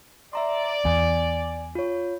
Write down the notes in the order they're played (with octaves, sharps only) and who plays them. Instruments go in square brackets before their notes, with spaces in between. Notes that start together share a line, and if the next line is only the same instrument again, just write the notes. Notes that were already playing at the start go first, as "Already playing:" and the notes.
[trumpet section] D5 [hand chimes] E5 A#5 C6
[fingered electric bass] E2 [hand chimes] G#5
[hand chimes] F4 C#5